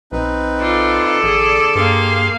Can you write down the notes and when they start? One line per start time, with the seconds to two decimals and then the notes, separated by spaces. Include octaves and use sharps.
0.12 B1 C4 D#4 B4
0.61 F4 A4 D5
1.23 A1 D3 G#4
1.75 G2 A#3 G4 G#4 F5 C6